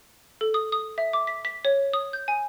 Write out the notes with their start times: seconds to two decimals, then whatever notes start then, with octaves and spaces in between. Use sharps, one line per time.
0.41 A4
0.54 D#6
0.72 D#6
0.98 E5
1.13 D6
1.27 B6
1.45 B6
1.65 C#5
1.93 D#6
2.13 G6
2.28 G#5